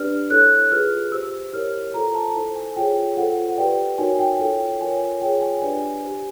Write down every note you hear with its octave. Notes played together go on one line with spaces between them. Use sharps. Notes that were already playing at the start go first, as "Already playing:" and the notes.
Already playing: D4 G4 B4 D5 F6
E4 A4 C#5 F#6
F4 G#4 B4 F6
G4 C5 E6
E4 G4 A#4 C#5 F6
F4 A4 C5 A#5
A5
E4 A4 C5
G#5
F4 G#4 C#5 G5
F4 A4 C5 F#5
F#5
G4 B4 D5 G5
D#4 F#4 A#4 C#5 G#5
G5
F4 A4 C#5 G5
F4 A#4 C#5 G#5
F4 G#4 C#5 G5
G#5
D4 G4 B4 D5 G#5
G4 C5